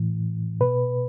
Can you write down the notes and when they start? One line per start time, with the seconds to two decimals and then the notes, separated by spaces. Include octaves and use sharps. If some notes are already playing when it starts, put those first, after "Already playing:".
Already playing: A2 E3
0.60 B2 B4